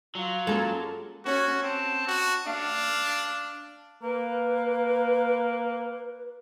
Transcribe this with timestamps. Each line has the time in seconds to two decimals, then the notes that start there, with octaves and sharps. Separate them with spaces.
0.15 F#3 F4
0.47 G#3 A#3 C#4 A4 A#5
1.25 C#4 F#4
1.63 C4 A5
2.07 F#4
2.47 D4 F5
4.03 A#3 B4